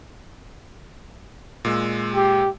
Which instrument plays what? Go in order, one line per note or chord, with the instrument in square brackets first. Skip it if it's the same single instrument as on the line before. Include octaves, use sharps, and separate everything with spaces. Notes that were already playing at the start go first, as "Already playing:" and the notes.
[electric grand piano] A#2 G#3 E6
[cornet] G4